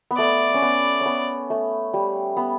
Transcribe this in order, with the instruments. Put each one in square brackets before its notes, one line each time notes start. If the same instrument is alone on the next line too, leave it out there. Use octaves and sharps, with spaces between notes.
[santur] B3
[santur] A3 [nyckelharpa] D5
[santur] C#4
B3
B3 C#4
A3
G3
B3